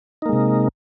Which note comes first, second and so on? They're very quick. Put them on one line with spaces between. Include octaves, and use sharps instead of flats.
D#4 A#3 G#3 C3